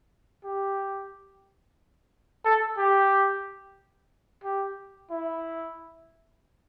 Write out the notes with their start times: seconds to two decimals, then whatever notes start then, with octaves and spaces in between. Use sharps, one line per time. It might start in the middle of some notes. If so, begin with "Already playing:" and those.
0.45 G4
2.45 A4
2.78 G4
4.44 G4
5.11 E4